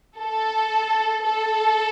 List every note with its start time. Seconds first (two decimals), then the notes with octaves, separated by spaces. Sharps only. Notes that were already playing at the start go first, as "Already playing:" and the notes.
0.17 A4
1.24 A4